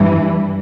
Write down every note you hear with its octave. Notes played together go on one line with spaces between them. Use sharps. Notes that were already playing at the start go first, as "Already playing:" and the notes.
Already playing: G2 E3